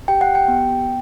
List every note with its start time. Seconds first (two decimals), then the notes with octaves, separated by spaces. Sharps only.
0.08 G4 G5
0.21 F#5
0.35 G5
0.48 B3